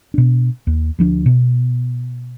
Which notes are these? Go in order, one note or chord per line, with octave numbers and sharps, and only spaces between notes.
B2 D4
D#2
D2 F3 D4
B2